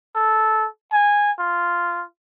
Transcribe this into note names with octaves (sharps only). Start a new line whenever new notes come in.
A4
G#5
F4